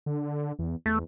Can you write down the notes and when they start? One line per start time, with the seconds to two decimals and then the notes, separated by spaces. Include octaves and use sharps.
0.06 D3
0.59 E2
0.86 E2 A3